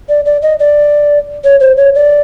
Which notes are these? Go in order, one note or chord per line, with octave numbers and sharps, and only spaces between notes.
D5
D5
D#5
D5
C#5
C5
C#5
D5